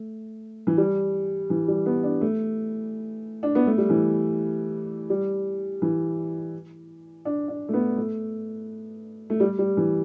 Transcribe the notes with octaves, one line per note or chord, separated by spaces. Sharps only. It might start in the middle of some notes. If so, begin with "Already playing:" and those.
Already playing: A3
E3
G3
E3
G3
B3
D4
A3
D4
B3
A3
G3
E3
G3
E3
D4
D4
A3
B3
A3
A3
G3
G3
E3